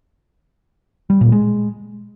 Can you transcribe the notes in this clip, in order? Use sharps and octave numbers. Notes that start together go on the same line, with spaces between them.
G3
A#2
G#3